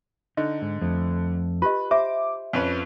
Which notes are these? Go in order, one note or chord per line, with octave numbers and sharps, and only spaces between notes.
D3 D#4 D#5
G#2
F2 A3
F4 G4 B4 D#5
C5 E5 D6
F2 C#4 B4